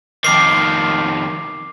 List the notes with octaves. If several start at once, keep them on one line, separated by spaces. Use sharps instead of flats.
F2 D#3 D6 C7